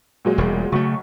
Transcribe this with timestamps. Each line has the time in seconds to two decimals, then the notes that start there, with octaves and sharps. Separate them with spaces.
0.25 A#2 F#3 G#3
0.38 E1 G3
0.72 B1 C#3 F#3 A3 C#6